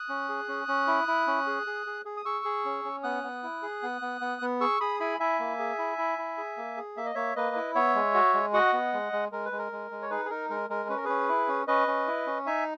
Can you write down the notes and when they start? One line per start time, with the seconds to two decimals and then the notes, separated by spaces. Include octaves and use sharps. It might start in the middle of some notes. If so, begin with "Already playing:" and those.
Already playing: D#6 F#6
0.09 C#4
0.29 G#4
0.48 C#4
0.68 C#4
0.87 E4
1.08 E4
1.27 C#4
1.47 G#4
1.67 G#4
1.86 G#4
2.05 G#4
2.17 D#6
2.25 G#4 C#6 E6
2.45 G#4
2.65 C#4
2.85 C#4
3.03 B3 D#6 F#6
3.23 B3
3.43 E4
3.62 G#4
3.82 B3
4.01 B3
4.21 B3
4.42 B3
4.61 G#4 C#6 E6
4.80 G#4 B5 D#6
5.00 E4 G#5 B5
5.20 E4 E5 G#5
5.39 A#3
5.59 G#4
5.79 E4
5.98 E4
6.18 E4
6.38 G#4
6.57 A#3
6.77 G#4
6.97 A#3 E5
7.06 D#5
7.15 A#3 C#5 E5
7.36 A#3 B4 D#5
7.56 E4
7.75 B3 C#5 E5
7.95 G#3
8.14 F#4
8.34 G#3
8.53 F#4 D#5 F#5
8.73 B3
8.93 G#3
9.13 G#3
9.32 G#3 A#4
9.45 B4
9.52 G#3
9.58 A#4
9.72 G#3
9.91 G#3
10.02 C#5
10.10 D#4 G#4 B4
10.25 G#4
10.30 D#4 A#4
10.50 G#3 A#4
10.69 G#3 A#4
10.89 C#4 B4
10.97 A#4
11.04 C#4 G#4 B4
11.29 E4
11.48 C#4
11.68 C#4 B4 D#5
11.88 C#4
12.07 E4
12.27 C#4
12.46 D#4 E5 G#5